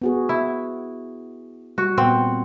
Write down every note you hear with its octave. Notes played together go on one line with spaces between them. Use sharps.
B3 F#4 G#4
E4
G3 F#4
A#2 B3 C4 F#5